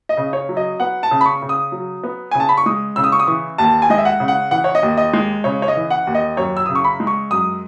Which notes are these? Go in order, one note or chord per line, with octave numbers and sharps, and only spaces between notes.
D#5
C#3
C#5
F#3
D#5
B3 F#5
A5
C#3
B5
C#6
C#3
D#6
F#3
B3
C#3 G#5
A5
B5
C#6
G#3 D#6
C#3 E6
D#6
C#6
D#6
E3 C#6
D#2 A5
G#5
G#3 D#5
E5
F#5
C#3
F#5
E3 F#5
C#5
D#5
D#2
D#5
G#3
C#3 C#5
C#5
D#5
E3
F#5
D#2
D#5
F#2 C#5
E6
C#3 D#6
C#6
B5
G#3
C#6
F#2 D#6